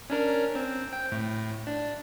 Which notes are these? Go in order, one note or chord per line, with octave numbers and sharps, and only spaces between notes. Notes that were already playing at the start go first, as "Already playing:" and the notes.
C#4 D4 A#4
C4
G5
A2
D4